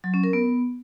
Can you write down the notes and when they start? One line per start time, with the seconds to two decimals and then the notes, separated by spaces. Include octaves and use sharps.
0.04 F#3
0.14 C#4
0.24 A#4
0.33 B3